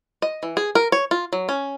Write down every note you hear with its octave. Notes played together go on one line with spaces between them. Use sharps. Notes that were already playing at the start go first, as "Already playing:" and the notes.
D#5
E3
G#4
A#4
C#5
F4
F#3
C#4